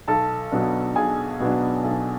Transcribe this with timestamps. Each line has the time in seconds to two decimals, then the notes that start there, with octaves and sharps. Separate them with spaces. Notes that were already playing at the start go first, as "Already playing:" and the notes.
0.07 B1 A4 A5
0.52 B2 F#3 B3 D4
0.96 B1 G#4 G#5
1.40 B2 F#3 B3 D4
1.84 B1 A4